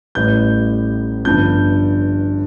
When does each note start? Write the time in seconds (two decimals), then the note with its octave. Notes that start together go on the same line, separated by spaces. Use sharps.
0.15 A1 A2 G3 G6
1.25 G1 G2 F3 G6